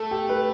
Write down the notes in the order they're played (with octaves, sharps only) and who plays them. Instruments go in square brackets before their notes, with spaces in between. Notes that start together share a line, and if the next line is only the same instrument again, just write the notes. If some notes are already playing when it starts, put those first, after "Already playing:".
Already playing: [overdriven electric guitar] A3 [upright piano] A4
[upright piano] G4
B4